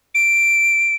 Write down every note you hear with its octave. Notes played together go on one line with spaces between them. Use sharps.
D7